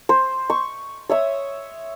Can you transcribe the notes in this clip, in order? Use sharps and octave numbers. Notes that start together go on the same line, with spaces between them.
C5
C#6
C#5 E5 D#6